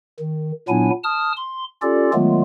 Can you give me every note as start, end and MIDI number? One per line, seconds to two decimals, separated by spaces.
0.19 0.52 51
0.68 0.90 46
0.68 0.90 54
0.68 0.90 59
0.68 0.90 62
0.68 0.90 64
0.68 0.90 80
1.04 1.33 81
1.04 1.33 87
1.04 1.33 89
1.36 1.64 84
1.82 2.11 61
1.82 2.11 65
1.82 2.11 67
1.82 2.11 69
1.82 2.11 74
2.13 2.42 51
2.13 2.42 54
2.13 2.42 56
2.13 2.42 57
2.13 2.42 59
2.13 2.42 65